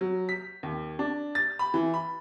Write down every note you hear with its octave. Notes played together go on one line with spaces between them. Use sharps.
F#3
B6
D#2
D4
A6
B5
E3
B5